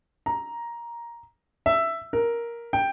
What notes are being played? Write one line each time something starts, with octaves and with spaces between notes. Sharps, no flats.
A#5
E5
A#4
G5